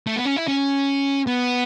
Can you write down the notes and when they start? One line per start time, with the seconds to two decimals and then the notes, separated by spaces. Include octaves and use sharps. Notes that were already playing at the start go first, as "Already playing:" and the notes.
0.07 A3
0.16 B3
0.25 C#4
0.36 E4
0.47 C#4
1.27 B3